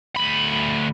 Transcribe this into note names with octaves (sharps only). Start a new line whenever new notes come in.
D2 B5